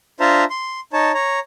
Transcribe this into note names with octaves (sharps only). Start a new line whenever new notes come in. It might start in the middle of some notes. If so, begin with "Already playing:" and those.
D4 F4 C5 E5 A5 A#5
C6
D#4 C#5 A5
C#5 A#5